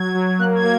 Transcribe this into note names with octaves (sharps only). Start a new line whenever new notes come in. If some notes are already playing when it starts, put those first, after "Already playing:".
Already playing: F#3 G#6
F#3
A#3 F#6
G#6
A#3